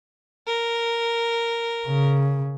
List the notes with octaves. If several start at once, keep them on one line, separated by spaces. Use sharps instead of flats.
A#4
C#3